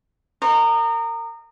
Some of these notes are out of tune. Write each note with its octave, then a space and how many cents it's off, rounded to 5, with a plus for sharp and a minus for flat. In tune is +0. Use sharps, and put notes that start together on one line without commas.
A#4 -20 D#5 -30 C6 +45